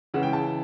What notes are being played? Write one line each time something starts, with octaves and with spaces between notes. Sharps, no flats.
C#3 E3 G#3 F#5
G5
A5